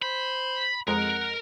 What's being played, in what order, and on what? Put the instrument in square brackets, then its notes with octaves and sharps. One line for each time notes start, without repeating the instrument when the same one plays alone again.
[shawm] C5 [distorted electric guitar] B5
[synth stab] F2 G#3 A#5 [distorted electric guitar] A#4 [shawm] F#5